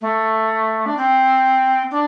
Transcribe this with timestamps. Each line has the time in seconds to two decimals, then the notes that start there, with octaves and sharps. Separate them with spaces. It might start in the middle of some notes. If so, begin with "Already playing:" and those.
0.01 A3
0.86 D4
0.97 C4
1.91 D4